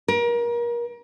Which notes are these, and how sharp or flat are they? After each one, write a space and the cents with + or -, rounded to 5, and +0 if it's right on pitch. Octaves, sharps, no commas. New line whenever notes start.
A#4 +30